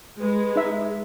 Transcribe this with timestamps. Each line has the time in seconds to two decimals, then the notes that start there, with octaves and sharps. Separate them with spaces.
0.20 G#3 B4
0.56 D#4 E5